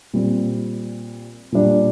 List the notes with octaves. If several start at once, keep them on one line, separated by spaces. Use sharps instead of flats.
A#2 G3 C4
A#2 G3 D4